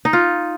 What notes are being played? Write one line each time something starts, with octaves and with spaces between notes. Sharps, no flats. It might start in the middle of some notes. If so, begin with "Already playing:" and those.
D#4
F4